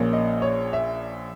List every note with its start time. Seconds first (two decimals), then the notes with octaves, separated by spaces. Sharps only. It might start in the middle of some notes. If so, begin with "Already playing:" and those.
Already playing: A#1 A#2 A#3 C#4
0.13 D#5
0.42 C#5
0.73 E5